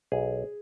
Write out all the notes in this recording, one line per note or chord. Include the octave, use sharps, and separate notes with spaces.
B1 G#4